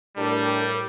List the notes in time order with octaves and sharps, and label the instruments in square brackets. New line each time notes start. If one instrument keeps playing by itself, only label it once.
[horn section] A2 G4 [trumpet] G3 [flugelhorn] D4 [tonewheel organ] A#4